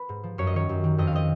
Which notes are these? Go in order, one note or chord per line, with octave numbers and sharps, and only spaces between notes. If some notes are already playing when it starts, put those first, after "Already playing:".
Already playing: B4
G#2
F3
F#2 C#5
D#5
D#3 C#5
F#2
D#3
F2 D#5
F5
F3 D#5